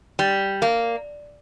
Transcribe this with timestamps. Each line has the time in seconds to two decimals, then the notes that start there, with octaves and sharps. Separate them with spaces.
0.19 G3
0.62 A#3